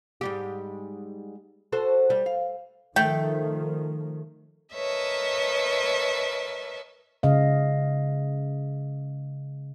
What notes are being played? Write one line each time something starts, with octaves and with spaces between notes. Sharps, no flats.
G#2 G3 G4
F#4 A4 C5
G3
F5
D#3 F3 A3 G5
A#4 B4 C#5 D#5 E5 A5
C#3 D#5 F5